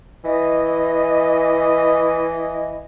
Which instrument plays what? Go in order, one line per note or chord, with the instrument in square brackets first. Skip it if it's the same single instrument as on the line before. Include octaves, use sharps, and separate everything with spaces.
[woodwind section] E3 D#5